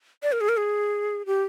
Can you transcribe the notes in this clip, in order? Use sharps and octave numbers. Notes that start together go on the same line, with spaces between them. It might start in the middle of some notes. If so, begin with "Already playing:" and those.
D5
A#4
G#4
A#4
G#4
G4